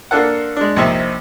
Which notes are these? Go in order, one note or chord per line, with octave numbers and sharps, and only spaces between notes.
A#3 D4 F4 A4 F#5
G#3 D4
A#1 C3 C4 D#4 E5